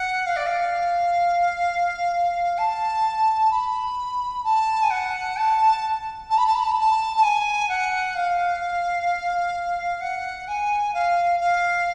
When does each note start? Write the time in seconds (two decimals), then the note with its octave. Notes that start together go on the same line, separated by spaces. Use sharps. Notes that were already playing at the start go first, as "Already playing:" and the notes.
Already playing: F#5
0.26 F5
0.36 D5
0.47 F5
2.58 A5
3.51 B5
4.44 A5
4.83 G#5
4.90 F#5
5.37 A5
6.30 A5
6.38 B5
6.46 A5
6.55 B5
6.63 A5
6.71 B5
6.80 A5
7.17 A5
7.23 G#5
7.69 F#5
8.15 F5
10.01 F#5
10.48 G#5
10.94 F5
11.40 F5